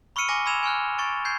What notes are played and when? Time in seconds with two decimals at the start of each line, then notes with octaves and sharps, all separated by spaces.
0.16 B5 C#6 E6 F6 C#7 D#7
0.28 G#5 D6 A#6 C7 D#7 G7
0.46 B5 C6 E6 G#6 E7 F7
0.63 G#5 C#6 F6 F#6
0.98 G#5 C#6 A6 D7
1.25 G6 G#6 C7